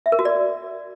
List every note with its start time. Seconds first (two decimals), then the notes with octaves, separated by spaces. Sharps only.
0.06 E5
0.12 A#4
0.19 F#4
0.25 D5